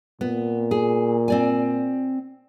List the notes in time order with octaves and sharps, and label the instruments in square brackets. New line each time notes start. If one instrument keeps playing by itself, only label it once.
[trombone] A#2 [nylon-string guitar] B3
[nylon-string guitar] G#4
C4 D5 G#5